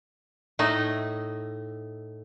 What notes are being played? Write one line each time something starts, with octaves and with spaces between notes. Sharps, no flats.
A2 A3 D#4 D#5